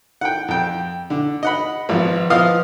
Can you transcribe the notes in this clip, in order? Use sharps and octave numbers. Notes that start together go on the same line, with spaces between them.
F#5 G5
F2 G5
D3
D#5 F#5 B5
G#1 F3 B3
F3 B3 D#5 F5 D#6 F6